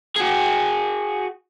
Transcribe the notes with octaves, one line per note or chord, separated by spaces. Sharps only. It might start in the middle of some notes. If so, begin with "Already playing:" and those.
F#4 G#4